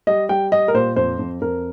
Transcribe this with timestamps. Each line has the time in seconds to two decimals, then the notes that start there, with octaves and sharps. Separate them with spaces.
0.07 G3 D#5
0.29 G3 G5
0.52 G3 D#5
0.68 A#4
0.74 A#2 C5
0.96 F2 C5
1.19 F2
1.41 F2 A#4